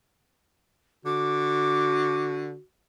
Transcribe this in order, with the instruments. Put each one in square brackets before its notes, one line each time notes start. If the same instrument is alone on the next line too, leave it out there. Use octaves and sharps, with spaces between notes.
[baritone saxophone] D3 [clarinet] F#4 [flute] D6